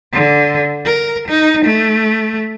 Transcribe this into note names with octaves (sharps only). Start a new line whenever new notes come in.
D3
A#4
D#4
A3